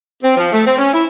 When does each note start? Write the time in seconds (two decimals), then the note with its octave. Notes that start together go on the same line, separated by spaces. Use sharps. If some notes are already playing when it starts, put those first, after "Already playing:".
0.24 C4
0.37 F3
0.53 A3
0.66 C4
0.78 C#4
0.93 E4